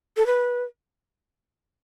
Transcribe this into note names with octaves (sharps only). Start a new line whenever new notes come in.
A4
B4